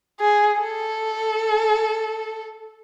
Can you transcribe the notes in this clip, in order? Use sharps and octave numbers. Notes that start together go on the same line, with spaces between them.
G#4
A4